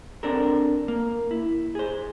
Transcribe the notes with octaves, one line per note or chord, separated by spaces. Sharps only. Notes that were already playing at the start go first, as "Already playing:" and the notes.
C4 D4 A4 A#4
A#3
E4
G#4 C5